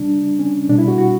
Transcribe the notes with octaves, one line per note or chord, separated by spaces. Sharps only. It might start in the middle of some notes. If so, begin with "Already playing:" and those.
Already playing: C#3 G3 D4
C#4
B2 G3 D4
E4
F#4
F#4